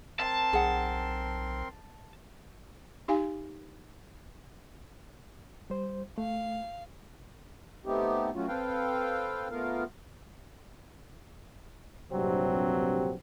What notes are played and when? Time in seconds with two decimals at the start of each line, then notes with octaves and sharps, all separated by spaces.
0.20 C4 A#4 A5 C6
0.53 B1 G#4 F#5
3.08 D#4 G4 F5 G#5
5.70 G3 C5
6.18 A3 F5
7.86 A3 B3 C4 D#4 G4
8.35 F#3 A3 C#4 F4 F#4
8.48 C4 A4 B4 F5 G5
9.51 A3 B3 F4 A#4 F5
12.11 A#1 G2 C3 F#3 G3 C4